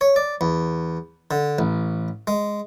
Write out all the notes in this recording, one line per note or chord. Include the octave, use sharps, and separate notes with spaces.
C#5
D5
E2
D3
A1
G#3